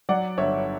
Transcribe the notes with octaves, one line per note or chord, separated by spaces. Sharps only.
F#3 D5 F#5
G1 C#5 E5